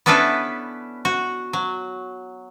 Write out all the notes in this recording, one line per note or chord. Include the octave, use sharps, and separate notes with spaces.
B3 C#4 D4 E4 A4 B4
F#4
F#3